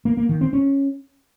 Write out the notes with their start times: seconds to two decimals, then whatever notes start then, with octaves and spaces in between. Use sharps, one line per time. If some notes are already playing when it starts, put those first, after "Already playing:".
0.05 A#3
0.17 A#3
0.29 D#3
0.41 C4
0.53 C#4